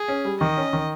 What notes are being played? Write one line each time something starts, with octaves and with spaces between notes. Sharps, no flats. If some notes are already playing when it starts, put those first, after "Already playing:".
Already playing: G#4
C#4
G3
D#3 D#5
C#4
D#3